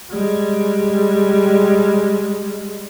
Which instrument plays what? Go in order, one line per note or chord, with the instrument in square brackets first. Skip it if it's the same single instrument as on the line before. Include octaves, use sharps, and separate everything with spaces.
[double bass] G3 G#3